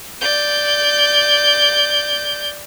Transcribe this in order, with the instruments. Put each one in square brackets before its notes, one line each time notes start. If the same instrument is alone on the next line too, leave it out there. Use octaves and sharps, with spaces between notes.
[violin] D5 G6